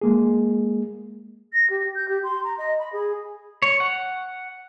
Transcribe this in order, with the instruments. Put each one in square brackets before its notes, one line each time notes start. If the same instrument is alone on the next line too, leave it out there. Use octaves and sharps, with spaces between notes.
[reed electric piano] G#3 A#3 G#4
[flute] A#6
G4
G6
G4
C6
A#5
D#5
B5
G#4
[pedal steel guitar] C#5
F#5